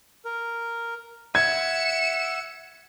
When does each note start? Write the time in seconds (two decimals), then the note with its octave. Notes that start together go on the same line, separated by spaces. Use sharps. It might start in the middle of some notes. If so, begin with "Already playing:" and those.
0.25 A#4
1.35 E5 F#5 G#6 C#7 E7